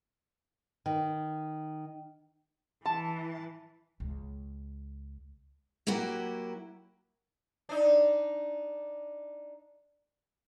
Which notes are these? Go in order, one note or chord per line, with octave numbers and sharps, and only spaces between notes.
D#3
E3 A5
C#2
F#3 A#3 E4 F#4 G4
D4 D#4